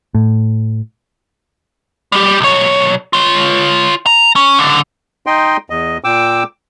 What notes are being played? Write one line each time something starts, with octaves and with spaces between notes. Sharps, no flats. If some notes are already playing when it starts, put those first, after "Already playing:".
A2
G3 G4
B1 C#5
F4 C#5
A#5
C#4
C#2 D3
D#4 D#5 G5 C6
E2 D#5
A#2 G5 D6 E6